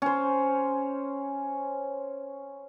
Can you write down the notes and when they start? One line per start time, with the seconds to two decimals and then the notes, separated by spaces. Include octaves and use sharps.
0.02 C#4 C5